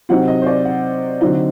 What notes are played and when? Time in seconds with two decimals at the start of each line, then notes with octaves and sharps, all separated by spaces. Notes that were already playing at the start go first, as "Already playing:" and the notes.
0.09 C3 F#3 C4 D#4 F#5
0.28 D#5
0.42 C5
0.47 D5
0.65 F#5
1.21 D3 F#3 C4 D#4